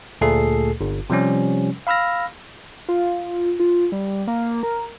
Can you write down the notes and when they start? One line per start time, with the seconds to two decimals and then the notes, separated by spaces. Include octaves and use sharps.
0.21 D2 A#2 A3 G#4 A4 C7
0.81 G1
1.10 C3 F3 G3 C#4
1.87 F5 B5 E6 F6 A#6
2.89 F4
3.60 F4
3.92 G3
4.27 A#3
4.63 A#4